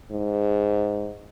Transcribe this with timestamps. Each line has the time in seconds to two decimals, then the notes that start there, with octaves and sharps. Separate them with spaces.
0.12 G#2